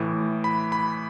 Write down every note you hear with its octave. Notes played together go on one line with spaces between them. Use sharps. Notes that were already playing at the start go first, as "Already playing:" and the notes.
Already playing: A2 E3
B5
B5